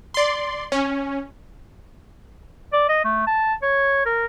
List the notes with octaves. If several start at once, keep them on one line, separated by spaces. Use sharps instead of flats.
D5 C6
C#4
D5
D#5
A3
A5
C#5
A#4